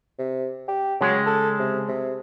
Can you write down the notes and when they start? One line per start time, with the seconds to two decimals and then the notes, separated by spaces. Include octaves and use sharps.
0.19 C3
0.68 G4
1.01 C#3 F#3 G#3
1.26 A4
1.59 C3
1.89 C3